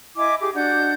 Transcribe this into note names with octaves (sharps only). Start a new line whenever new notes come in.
E4 D#5 G#5 D6
G4 G#4 D6
D4 F#4 F#5 G6